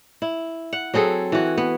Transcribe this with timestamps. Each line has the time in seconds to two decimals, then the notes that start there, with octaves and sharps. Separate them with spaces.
0.22 E4
0.73 F#5
0.94 F#3 C4 G#4 A4
1.32 E3 F#4
1.57 B3